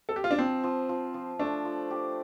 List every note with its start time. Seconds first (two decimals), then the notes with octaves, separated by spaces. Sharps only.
0.09 A4
0.16 G4
0.24 F4
0.31 D4
0.39 F3 C4
0.64 F3
0.89 F3
1.14 F3
1.39 A3 D4
1.65 F3
1.90 G4